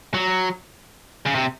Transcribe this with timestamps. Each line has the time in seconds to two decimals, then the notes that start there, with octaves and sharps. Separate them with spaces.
0.14 F#3
1.26 C#3
1.35 C3